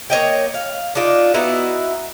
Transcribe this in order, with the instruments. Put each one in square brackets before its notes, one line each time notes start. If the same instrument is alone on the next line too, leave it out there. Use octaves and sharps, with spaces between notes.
[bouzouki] A#3 C#5 D#5 G5
F5
D4 D#4 F4 D5
B3 D#4 E4 F#4